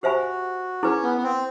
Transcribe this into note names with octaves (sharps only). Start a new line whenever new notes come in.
F#4 G4 C5 E5 G#5 B5
C#4 E4 G#4 B4
B3
B3
C4